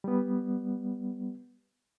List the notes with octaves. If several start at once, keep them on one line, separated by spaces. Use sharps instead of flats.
G3 B3